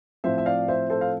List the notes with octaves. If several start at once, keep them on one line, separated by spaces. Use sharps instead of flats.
A2 F3 C4 C5 E5
E5
D5 F5
C5 E5
A4 C5
F5